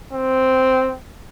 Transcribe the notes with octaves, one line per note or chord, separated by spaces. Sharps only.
C4